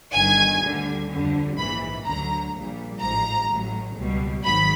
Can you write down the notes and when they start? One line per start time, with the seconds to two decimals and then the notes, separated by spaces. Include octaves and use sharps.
0.13 G1 G2 D#3 G#5
0.61 D2 D3 G3
1.09 F2 D3 G3
1.57 A#1 G#2 E3 B5
2.04 D2 D3 F#3 A#5
2.53 A#1 A#2 G3
3.00 A1 G#2 F3 A#5
3.48 A1 A2 F#3
3.97 C#2 B2 G3
4.44 G#1 G#2 D#3 F#3 B5